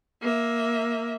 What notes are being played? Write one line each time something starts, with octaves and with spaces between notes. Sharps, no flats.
A#3 E5